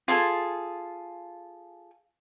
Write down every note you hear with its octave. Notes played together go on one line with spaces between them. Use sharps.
F4 G#4 A4 G#5